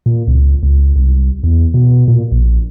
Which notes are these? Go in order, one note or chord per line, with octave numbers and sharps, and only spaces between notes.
A#2
C#2
C#2
C2
E2
B2
A#2
A#1